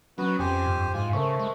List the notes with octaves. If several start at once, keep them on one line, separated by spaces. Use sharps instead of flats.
F#3 B3 C#4 F#4 B4
F2 G4 C5 G#5
G2
G#2 F4 G#5
C#3 A3 A#4 C5 C#6
G#3